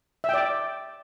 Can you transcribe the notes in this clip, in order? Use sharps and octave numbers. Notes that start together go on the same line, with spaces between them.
D5 E5 G5